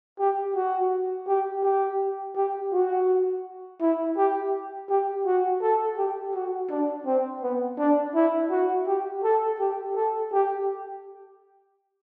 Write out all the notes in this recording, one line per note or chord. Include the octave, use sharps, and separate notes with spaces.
G4
F#4
G4
G4
G4
F#4
E4
G4
G4
F#4
A4
G4
F#4
D4
C4
B3
D4
E4
F#4
G4
A4
G4
A4
G4